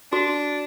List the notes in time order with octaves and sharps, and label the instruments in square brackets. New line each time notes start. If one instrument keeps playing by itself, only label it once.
[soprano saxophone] D4 [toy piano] F#4